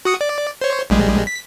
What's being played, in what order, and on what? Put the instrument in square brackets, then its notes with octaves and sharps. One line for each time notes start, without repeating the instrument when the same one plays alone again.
[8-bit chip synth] F#4 D#6 C#7
D5
C5 C#5
A#1 G3 G#3
B6